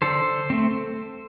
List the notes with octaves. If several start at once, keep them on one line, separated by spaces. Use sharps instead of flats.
D3 A4 C5
A3 C4